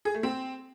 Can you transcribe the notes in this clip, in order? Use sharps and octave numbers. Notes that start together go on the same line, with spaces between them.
G#4
A3
C4